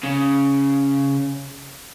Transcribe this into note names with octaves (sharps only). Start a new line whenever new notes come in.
C#3